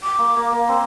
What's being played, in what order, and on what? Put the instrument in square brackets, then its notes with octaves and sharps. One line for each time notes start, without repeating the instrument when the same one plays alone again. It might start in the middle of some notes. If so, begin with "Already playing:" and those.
[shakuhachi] D6
[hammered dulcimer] A#3
A#3
A#3
[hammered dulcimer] C4 [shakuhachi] C6